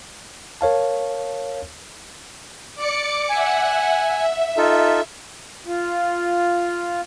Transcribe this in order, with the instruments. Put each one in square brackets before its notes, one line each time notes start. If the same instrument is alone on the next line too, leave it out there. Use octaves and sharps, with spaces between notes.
[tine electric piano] A#4 C#5 F5 A5
[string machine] D5 D6 C#7
[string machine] E5 F#5 [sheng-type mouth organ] G#5
[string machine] E5
[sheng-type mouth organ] D#4 F4 A4
[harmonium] F4